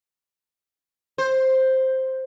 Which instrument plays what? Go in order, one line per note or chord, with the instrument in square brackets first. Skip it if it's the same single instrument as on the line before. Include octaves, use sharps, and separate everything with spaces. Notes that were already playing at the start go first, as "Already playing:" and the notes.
[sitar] C5